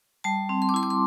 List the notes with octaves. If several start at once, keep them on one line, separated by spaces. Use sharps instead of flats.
G3 A5
C4
C6
D6
E4 C6
D6
C6